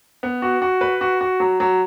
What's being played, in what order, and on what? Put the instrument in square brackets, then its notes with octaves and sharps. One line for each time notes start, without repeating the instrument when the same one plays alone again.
[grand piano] B3
F#4
F#4
B4
F#4
F#4
F#3
F#3